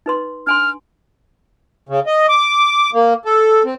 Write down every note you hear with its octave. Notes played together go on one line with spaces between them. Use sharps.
D#4 B4 C6
D4 G#5 C6 F6
C#3
D#5
D6
A#3
A4
C4